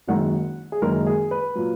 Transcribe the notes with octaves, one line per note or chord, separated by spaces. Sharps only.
F#1 F#2 D#3 G#3 F#5
G#4
F#1 F#2 D#3 G#3 A#4
G#4
B4
A#2 F#3